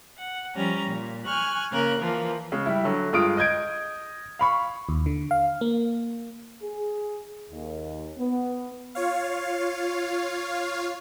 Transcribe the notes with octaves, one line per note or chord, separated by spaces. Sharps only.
F#5
F3 G3 C#4 A#5
A#2
G#5 C#6 F6 F#6
C#3 A#3 A#4 F#6
E3 F3 A#3
C#3 G#3
G3 E4
D3 F#3
G2 G#3 F4 D#6 D7
D#5 G6 G#6 D7
F5 B5 C#6
D#2
D3
F5
A#3
G#4
D#2
B3
F4 C#5 F5